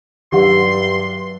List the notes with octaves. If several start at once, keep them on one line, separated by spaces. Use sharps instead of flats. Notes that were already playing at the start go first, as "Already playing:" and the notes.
G2 D#3 F#3 G4 E5 F#5 C6